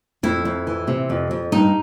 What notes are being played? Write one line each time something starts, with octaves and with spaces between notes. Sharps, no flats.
F2 E4
F2
E3
C3
F2
F2
G2 D#4